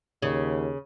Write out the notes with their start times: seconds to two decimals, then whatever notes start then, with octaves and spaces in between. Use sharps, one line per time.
0.22 D#2 C#3